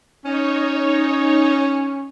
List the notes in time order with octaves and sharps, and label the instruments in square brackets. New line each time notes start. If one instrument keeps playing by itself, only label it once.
[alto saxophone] C#4 [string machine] D#4 C#5